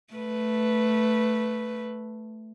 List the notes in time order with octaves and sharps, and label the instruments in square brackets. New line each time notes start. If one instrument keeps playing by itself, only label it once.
[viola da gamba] A3 B4